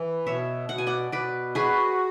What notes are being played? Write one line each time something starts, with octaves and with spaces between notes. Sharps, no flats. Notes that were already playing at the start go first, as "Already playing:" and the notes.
Already playing: E3
B2 C#5 E5
B2 F#5
G#5
D5 F#5
B2 B4 D5
F#4 G#4 B4